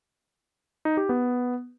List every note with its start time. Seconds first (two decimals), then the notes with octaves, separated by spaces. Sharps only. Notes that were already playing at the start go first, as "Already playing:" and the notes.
0.85 D#4
0.97 G4
1.09 B3